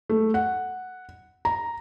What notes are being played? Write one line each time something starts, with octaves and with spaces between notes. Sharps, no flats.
A3
F#5
A#5